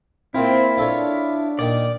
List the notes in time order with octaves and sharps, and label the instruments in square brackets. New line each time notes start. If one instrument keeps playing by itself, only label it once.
[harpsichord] A#3 F4 [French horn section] C4 [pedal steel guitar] E4
[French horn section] D4 [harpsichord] F4 A4 C#5
[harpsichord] A#2 D#3 G5 [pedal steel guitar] D5